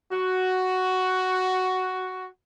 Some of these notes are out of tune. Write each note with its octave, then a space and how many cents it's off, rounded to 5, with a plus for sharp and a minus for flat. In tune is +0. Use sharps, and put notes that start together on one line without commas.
F#4 +5